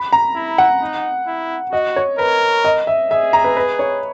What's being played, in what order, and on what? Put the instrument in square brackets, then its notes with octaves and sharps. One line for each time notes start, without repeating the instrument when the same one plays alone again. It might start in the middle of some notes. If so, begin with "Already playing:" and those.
Already playing: [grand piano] B5
A#5
[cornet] E4
[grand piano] F#5
[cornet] D#4
E4
[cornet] F#4 [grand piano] D#5
[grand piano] C#5
[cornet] A#4 [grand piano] B4
[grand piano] D#5
E5
[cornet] G#4 [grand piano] E5
[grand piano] A#5
B4
B4
C#5